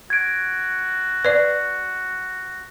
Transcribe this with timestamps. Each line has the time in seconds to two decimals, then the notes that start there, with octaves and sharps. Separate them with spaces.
0.10 F#4 G#6 D7
1.25 B4 D5